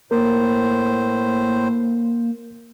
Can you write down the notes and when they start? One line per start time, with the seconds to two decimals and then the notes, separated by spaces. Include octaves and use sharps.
0.11 A2 A#3 A#4 C5